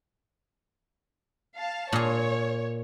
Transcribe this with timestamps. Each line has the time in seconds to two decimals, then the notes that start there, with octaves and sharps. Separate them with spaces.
1.58 F5 A5
1.92 A#2 G#4 C#5